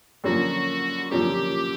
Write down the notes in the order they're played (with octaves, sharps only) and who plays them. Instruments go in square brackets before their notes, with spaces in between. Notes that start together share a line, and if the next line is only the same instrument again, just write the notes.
[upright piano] F#2 D3 F3 A#3 C#4 [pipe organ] F#4
[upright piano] F#2 D3 F3 A#3 C#4 [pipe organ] G4